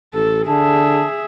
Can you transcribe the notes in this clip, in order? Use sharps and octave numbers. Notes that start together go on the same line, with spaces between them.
A1 A4
D3 G#4 E5 A5